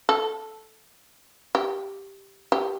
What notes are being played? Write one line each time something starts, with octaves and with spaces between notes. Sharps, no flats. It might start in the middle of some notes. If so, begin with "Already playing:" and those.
A4
G4
G4